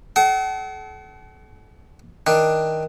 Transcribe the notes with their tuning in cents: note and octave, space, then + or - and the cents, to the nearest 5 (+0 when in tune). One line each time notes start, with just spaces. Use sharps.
A4 -40 F#5 +40
D#3 +15 D4 +15